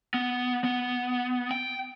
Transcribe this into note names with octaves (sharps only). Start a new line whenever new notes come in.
B3
B3
G5